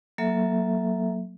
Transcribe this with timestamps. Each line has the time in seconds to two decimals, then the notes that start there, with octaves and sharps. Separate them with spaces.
0.18 F#3 A#3 A4 E5